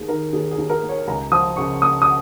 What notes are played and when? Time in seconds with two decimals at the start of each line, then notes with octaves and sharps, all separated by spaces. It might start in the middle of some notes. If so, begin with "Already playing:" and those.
Already playing: D#2 A#3 G#4
0.08 D#3 A#4
0.33 D#2 G#4
0.51 G#4
0.58 D#2
0.70 A#4
0.83 A#3
0.89 C#5
1.07 C#2 A#5
1.32 F3 D#6
1.56 C#3 C#6
1.82 A#3 D#6
2.02 D#6